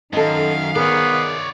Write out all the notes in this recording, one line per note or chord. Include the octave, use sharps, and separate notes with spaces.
F#2 D#3 D#4 A4 F5
B3 G#4 A#4 C#5 D5